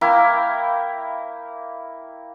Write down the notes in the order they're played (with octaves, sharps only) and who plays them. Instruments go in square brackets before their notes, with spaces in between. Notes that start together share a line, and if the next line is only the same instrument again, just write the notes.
[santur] A#3 E4 F5 G5